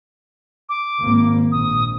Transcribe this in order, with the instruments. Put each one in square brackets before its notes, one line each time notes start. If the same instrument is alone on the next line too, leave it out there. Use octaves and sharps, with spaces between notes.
[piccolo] D6
[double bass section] G#1 A#3
[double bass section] A#1 [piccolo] D#6